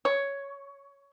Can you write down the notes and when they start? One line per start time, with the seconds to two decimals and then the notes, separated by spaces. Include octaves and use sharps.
0.05 C#5